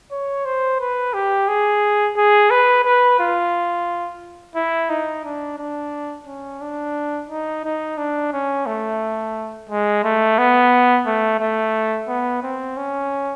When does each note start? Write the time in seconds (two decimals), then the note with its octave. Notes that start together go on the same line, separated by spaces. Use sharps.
0.11 C#5
0.45 C5
0.80 B4
1.14 G4
1.48 G#4
2.17 G#4
2.50 B4
2.84 B4
3.20 F4
4.55 E4
4.89 D#4
5.24 D4
5.58 D4
6.27 C#4
6.61 D4
7.29 D#4
7.64 D#4
7.97 D4
8.33 C#4
8.66 A3
9.69 G#3
10.04 A3
10.38 B3
11.06 A3
11.40 A3
12.08 B3
12.43 C4
12.77 C#4